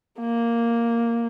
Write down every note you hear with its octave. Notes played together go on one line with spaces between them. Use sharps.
A#3